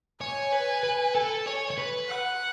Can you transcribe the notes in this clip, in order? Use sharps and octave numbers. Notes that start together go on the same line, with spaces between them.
C#5 G#5
B4
B4
A4
C#5
C#5
B4
F#5